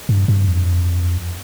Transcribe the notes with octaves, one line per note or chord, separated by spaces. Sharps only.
G2
G2
F2